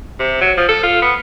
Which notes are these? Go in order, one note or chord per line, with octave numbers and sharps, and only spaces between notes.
C3
F#3
F3
A4
F4
B3